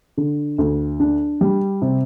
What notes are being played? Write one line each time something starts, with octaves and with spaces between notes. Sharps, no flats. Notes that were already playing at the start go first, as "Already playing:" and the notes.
D3
D2
D4
G3
C3